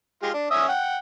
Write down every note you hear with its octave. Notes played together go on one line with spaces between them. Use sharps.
G#3 F4 G4
D4
C#4 E5 D#6
F#5 G5